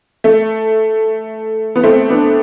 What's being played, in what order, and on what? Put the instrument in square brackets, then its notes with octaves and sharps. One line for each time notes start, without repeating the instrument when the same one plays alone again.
[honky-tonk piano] A3
B3
A3 C4
B3 D4